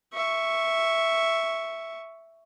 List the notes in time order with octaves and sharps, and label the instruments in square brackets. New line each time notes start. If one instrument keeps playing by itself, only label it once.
[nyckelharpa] E5 C#6